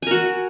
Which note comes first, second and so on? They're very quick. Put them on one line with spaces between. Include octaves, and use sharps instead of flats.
G#5 A#4 F#4